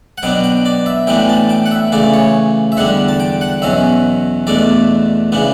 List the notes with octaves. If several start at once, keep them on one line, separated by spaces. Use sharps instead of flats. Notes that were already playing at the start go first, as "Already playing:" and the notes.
F#5
B2 F#3 B3 D4 G5
G5
D5
E5
A2 E3 B3 D4 G5
A5
G5
F#5
E5
C#3 E3 A3 D5
C#5
E5
E2 D3 G3 D4 F#5
A5
G5
F#5
E2 B2 F#3 C#4 E5
E2 B2 A3 D4 D5
C#3 E3 B3 D4